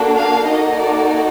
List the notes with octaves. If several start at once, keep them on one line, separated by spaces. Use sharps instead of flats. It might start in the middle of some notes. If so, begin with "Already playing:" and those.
Already playing: A#3 D4 F#4 A4
F5
A#3 D#4 F#4 A4 D#5
D5